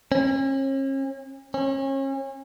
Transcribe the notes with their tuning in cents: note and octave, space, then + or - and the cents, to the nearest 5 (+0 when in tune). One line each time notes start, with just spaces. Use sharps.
C#4 -40
C#4 -35